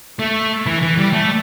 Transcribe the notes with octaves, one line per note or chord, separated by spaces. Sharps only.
A3
E3
E3
G3
A3